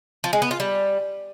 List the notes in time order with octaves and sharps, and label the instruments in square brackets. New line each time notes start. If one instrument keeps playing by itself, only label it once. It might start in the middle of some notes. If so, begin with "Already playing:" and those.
[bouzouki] F3
G#3
B3
F4
G3